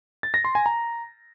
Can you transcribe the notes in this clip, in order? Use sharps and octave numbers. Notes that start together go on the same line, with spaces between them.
A6
A#6
C6
G#5
A#5